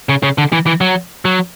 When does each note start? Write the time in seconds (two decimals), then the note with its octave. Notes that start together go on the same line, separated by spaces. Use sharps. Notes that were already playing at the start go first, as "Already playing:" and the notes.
0.09 C#3
0.23 C#3
0.38 D3
0.52 E3
0.66 E3
0.81 F#3
1.25 F#3